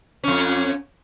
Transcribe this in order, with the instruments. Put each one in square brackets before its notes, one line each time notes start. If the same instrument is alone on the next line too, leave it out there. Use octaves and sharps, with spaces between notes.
[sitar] F2 C#4